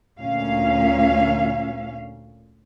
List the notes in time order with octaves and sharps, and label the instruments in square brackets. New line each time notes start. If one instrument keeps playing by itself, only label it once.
[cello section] D2 A#2 C#4 F5